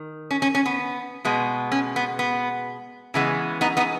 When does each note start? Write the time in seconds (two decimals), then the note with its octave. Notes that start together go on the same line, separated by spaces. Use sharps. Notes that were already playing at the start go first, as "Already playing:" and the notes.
Already playing: D#3
0.31 C#4
0.42 C#4
0.55 C#4
0.66 B3
1.25 B2 G#3 B3
1.72 C#4
1.96 B3
2.19 B3
3.14 C#3 E3 G#3 B3
3.61 B3 D#4
3.77 B3 D#4